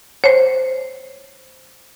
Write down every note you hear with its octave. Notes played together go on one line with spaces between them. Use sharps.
C5 C#5